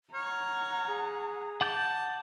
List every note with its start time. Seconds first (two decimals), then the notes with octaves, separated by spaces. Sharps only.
0.14 C#5 F#5 A#5 F6
0.87 G#4
1.61 F#5 A5 D6 G6